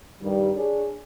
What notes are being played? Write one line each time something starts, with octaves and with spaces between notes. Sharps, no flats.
G2 D#3 G3
D4 G#4 C#5